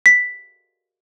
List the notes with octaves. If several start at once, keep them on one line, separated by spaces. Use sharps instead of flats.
B6